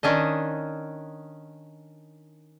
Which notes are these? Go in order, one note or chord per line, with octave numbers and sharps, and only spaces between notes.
D#3 C#4 D4 D#5